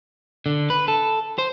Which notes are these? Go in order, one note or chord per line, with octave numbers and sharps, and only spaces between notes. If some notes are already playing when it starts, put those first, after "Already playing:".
D3
B4
A4
C5